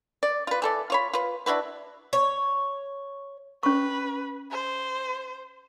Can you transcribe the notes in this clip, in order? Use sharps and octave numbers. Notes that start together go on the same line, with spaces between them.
D5
F4 B4
E3 A4 D5
F4 C#5 B5
F4 B4
D4 E4 F#4 B4
C#5
C#4 B4 C#6
C5